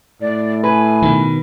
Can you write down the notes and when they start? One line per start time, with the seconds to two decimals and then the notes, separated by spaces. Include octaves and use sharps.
0.21 A2 D5
0.64 B4 G#5
1.02 B2 D#3